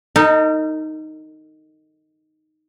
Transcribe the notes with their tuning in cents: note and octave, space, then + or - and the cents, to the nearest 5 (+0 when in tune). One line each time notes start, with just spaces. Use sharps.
D#4 +0 A#4 -45